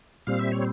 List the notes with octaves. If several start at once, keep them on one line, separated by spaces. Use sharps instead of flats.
A#2 G3 C4 F5
E5
C#5